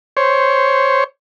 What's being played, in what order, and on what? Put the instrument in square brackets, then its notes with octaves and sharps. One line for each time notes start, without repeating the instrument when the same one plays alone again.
[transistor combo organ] C5 C#5